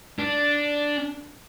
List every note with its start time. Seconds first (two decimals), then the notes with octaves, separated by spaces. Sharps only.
0.19 D4